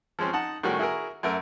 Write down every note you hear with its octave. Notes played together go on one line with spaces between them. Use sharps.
F3 G#3 C4 C#4
D#4 F#5 A5
A2 D#3 G3 C#4 F#4 G#4
E4 F#4 G#4 A#4
F#2 A3 A#4